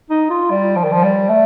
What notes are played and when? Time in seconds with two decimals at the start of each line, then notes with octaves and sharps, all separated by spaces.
0.10 D#4
0.30 F4
0.50 G3
0.76 F3
0.84 D#3
0.92 F3
1.03 G3
1.29 A3